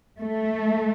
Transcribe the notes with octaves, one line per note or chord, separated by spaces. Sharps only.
A3